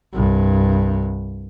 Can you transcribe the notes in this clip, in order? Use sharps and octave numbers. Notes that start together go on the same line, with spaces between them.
C2 G2